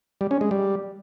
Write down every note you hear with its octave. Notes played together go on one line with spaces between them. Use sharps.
G3
C#4
G#3
G3